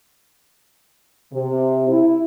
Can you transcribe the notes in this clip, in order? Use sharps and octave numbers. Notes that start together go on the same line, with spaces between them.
C3
E4